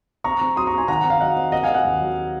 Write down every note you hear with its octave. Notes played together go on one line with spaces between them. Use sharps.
C4 A#5 C#6
C4
F#3 C6 D#6
C4 A#5 C#6
G#5 C6
D#3 F#5 A#5
C4
F5
F#3 D#5 F#5
C4
A#3 D#5 F#5
A#3 F5 G#5
D#5 F#5
D#2
F#3